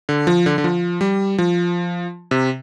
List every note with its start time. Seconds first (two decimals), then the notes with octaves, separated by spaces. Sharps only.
0.09 D3
0.27 F3
0.46 D3
0.58 D3
0.64 F3
1.01 G3
1.38 F3
2.31 C3